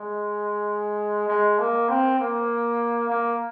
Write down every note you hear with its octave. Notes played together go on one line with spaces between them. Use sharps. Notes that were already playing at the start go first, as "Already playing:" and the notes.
Already playing: G#3
G#3
A#3
C4
A#3
A#3